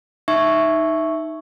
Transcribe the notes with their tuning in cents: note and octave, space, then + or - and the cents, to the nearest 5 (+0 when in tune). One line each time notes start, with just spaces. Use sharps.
D#4 +0 E5 +0 C#6 +0